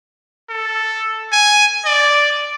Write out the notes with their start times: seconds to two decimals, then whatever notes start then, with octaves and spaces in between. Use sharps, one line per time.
0.50 A4
1.33 G#5
1.86 D5